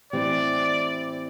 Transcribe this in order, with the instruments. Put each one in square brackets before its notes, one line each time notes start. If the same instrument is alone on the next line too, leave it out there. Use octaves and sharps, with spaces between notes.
[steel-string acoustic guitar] A2 E3 C4 G4 [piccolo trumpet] D5